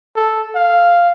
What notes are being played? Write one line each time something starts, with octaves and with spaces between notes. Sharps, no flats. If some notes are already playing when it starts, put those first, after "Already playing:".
A4
F5